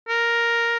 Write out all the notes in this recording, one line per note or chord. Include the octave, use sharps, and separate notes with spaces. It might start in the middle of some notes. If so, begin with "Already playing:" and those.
A#4